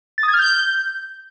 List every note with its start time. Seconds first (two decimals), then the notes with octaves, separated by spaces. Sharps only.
0.18 A6
0.23 D#6
0.28 G#6
0.34 F6
0.39 G6